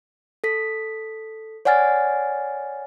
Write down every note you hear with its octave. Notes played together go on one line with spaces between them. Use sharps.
A4 B6
C#5 D5 F#5 G#5 F6 A6